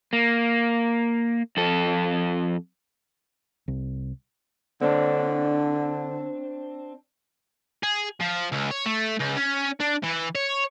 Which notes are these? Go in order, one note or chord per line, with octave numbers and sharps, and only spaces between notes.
A#3
F2 A4
C2
D3 C4 D4
G#4
F3
C#2
C#5
A3
C#2
C#4
D4
E3
C#5